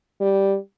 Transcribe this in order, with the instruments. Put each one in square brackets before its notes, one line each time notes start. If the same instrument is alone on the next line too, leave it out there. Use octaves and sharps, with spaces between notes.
[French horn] G3